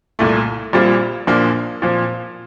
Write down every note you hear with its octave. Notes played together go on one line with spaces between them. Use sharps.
C2 A#2 A3
A#1 A#2 G3 C4 F4
A#1 A#2 F3 A#3 D4
A#2 F3 C4